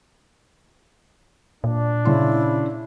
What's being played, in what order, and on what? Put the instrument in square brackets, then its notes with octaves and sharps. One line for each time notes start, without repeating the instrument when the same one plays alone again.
[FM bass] A#2 [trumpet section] D4
[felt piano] C#3 C6 [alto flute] E4